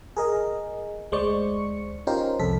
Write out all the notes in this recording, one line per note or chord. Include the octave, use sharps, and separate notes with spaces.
G#4 A#4 D#5
D2 G#3 C5 D5 C#6 C#7
C#4 D#4 F4 G4 A#4 C5
C2 F2 A4 B6